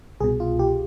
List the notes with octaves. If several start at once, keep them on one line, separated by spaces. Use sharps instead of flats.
C2 B2 G#4
F4
G4